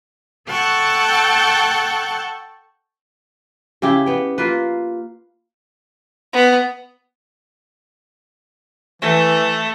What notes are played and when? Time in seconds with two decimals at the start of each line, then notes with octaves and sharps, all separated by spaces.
0.49 A4 F#5 G5 A5 C#6
3.82 C#3 E4 G4 G5
4.06 B3 G5
4.38 A#3 F4 B4
6.33 B3
9.02 E3 A3